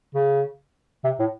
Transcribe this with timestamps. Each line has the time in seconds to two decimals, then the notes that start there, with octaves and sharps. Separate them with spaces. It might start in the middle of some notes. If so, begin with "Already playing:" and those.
0.15 C#3
1.04 C3
1.19 A2